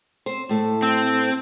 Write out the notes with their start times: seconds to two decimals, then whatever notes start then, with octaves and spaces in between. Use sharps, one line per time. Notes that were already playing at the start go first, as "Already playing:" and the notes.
0.26 C4 C5
0.49 A2 A3
0.82 C4